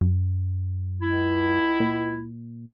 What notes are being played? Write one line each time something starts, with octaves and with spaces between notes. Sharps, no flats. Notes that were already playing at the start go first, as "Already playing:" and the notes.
F#2
C#2 E4
A#2